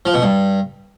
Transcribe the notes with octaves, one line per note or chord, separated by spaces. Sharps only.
F3
B2
G2